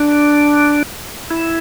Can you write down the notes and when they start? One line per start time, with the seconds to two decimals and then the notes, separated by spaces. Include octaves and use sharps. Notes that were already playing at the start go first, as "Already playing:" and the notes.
Already playing: D4
1.30 E4